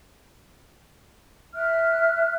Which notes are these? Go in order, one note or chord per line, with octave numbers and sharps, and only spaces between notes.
E5 F6 F#6